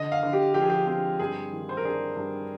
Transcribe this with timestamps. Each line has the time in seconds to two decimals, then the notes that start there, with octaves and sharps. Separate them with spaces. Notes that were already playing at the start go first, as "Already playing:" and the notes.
Already playing: D3 D#5
0.12 F5
0.23 D3
0.33 G4
0.54 F3 G4
0.61 G#4
0.70 G4
0.87 C4 G4
1.19 G2 G#4
1.53 D#3
1.69 C5
1.77 A#4
1.84 D4 G#4
2.16 G2